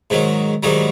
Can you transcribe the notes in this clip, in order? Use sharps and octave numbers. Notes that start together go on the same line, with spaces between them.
G#2 D#3 F#3
G#2 D#3 F#3 G3